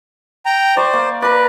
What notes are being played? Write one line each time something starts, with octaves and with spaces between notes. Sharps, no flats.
G5 A#5
C5 D5 C#6
A#3
A#4 B4 D5